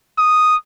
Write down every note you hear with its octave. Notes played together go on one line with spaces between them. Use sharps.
D#6